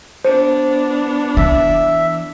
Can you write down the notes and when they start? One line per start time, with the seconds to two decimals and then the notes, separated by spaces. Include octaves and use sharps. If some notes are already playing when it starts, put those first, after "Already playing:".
0.25 B3 D4 C5
1.37 E3 E5